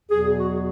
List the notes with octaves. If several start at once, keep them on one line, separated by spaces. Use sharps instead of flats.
E2 B2 F#3 G#4
F#4